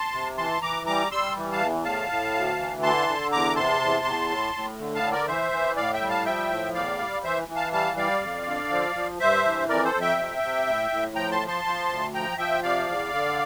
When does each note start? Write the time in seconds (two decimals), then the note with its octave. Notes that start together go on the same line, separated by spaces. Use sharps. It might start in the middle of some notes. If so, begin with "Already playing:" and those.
Already playing: A5 C6
0.13 C3
0.38 E3 A5 C6
0.62 E3 A#5 D6
0.86 G3 A#5 D6
1.11 G3 C6 E6
1.36 E3
1.52 F5 A5
1.61 E2
1.84 A2 F5 A5
2.10 A2
2.34 D2
2.58 E3
2.83 D3 A5 C6
3.08 D3
3.32 E2 A#5 D6
3.56 C3 A5 C6
3.81 E2
4.05 E2
4.30 A2
4.55 A2
4.79 D3
4.95 F5 A5
5.03 D3
5.12 A#4 D5
5.28 E3 C5 E5
5.52 E3
5.76 A2 D5 F5
5.94 E5 G5
6.01 G3
6.09 F5 A5
6.25 F3 E5 G5
6.50 A2
6.74 E2 D5 F5
6.99 G3
7.24 E3 C5 E5
7.48 E3
7.56 F5 A5
7.73 G3 F5 A5
7.97 G3 D5 F5
8.21 F2
8.47 D3
8.71 F3
8.95 F3
9.20 G2 C5 E5
9.45 E3
9.68 F2 A#4 D5
9.85 A4 C5
9.94 F2
10.01 E5 G5
10.18 C3
10.43 C3
10.67 A2
10.91 A2
11.15 F3 G5 A#5
11.31 A5 C6
11.41 F3
11.48 A5 C6
11.64 F3
11.89 D2
12.14 F3 G5 A#5
12.38 F3 E5 G5
12.63 C3 D5 F5
12.87 E2
13.12 D3